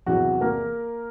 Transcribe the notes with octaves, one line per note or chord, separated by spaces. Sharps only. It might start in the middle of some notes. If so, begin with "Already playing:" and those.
E2 C3 E3 F#3 F#4
A#3 A#4